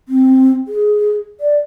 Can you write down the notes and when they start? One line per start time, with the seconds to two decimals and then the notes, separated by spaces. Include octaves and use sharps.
0.08 C4
0.68 G#4
1.40 D5